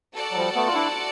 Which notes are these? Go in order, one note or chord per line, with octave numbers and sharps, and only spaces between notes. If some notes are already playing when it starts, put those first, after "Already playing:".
F#4 A4 D5 F#5 A5
F#3
F3 G3
A3 B3
F4
D4 E4